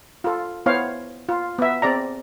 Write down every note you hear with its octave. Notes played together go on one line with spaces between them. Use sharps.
F4 A4
B3 E4 C5 C#5 F5
F4
B3 E5
C4 G#4 D5 A#5